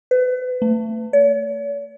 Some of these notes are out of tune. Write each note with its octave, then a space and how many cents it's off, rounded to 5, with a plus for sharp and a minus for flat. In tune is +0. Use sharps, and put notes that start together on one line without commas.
B4 +35
A3 +30
C#5 +45